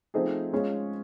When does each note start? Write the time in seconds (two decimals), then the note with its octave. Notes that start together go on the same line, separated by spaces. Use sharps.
0.14 F3 A3 C4 D#4 G#4
0.53 G#3 C#4 F4 G#4